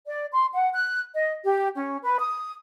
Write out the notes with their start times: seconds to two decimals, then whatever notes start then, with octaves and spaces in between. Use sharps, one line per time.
0.07 D5
0.33 C6
0.53 F#5
0.73 F#6
1.13 D#5
1.44 G4
1.75 C#4
2.02 B4
2.19 D#6